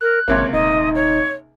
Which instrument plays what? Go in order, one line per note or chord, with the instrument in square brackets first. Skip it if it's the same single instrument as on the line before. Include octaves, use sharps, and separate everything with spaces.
[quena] A#4 [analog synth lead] F#6
[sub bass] G#1 [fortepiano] C#2 C3 A#3 [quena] C#5
[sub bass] D#1 [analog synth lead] D#4 [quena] D#5
[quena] C#5